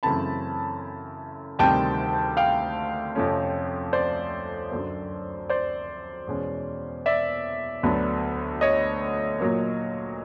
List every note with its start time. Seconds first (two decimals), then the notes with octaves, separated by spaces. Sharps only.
0.03 F#2 C#3 E3 A3 C4 A5 B5
1.59 D2 C3 D#3 G3 C4 G5 A5
2.37 F5 G5
3.15 F2 C3 F3 A3 C#4
3.93 C5 D5
4.72 F#2 D3 F#3
5.50 C5 D5
6.27 E2 B2 G#3 C#4
7.06 D5 E5
7.83 D2 D3 F#3 B3 D4
8.61 C#5 D#5
9.40 A#2 F#3 A#3